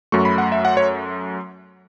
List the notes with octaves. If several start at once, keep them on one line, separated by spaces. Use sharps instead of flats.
F#2 F#3 A3 C#6
B5
F#5
E5
F#5
C#5